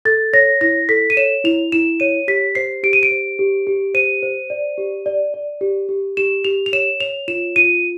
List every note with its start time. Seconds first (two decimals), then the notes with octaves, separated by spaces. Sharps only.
0.05 A4 A6
0.33 C#5 A#6
0.61 E4 A#6
0.89 A4 B6
1.10 D#7
1.17 C#5 E7
1.44 E4 F7
1.72 E4 E7
2.00 C#5 D#7
2.28 G4 B6
2.55 C5 C7
2.83 G4 D7
2.93 D#7
3.03 D7
3.11 C5
3.39 G4
3.67 G4
3.94 C5 D#7
4.23 C5
4.50 D5
4.78 G4
5.06 D5
5.34 D5
5.61 G4
5.89 G4
6.17 G4 E7
6.45 G4 F7
6.66 F7
6.73 C#5 E7
7.00 C#5 F7
7.28 F4 E7
7.56 F4 D#7